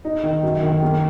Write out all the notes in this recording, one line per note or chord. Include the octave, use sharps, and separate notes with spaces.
D#4
D#3
F#2
D#3
A#3